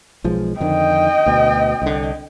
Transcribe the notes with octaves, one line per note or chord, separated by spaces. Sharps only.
B1 F3 G#3
F2 D3 D#3 D#5 G5
D2 B2
C2 D3